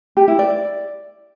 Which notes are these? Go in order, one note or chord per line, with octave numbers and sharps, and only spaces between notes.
G4
E4
D5